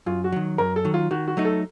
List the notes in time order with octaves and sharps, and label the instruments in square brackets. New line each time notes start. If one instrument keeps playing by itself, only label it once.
[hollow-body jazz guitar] F#2 [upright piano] F4
[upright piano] F#4
[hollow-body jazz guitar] D#3 F#3
[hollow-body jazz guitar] F#2 [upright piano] A#4
[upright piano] A4
[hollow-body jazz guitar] D#3 F#3
[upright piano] F4
[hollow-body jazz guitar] D#3 [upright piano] F#4
[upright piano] F#4
[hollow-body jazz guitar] F#3 A3 D#4
[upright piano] A4